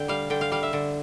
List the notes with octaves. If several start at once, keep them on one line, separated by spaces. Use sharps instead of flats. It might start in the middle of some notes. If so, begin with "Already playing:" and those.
Already playing: D3 G5
G3 F5
D3 G5
F5
G3 F5
E5
D3